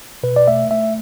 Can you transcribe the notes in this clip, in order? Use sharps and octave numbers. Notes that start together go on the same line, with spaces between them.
B2 B4
D5
A3 E5
A3 E5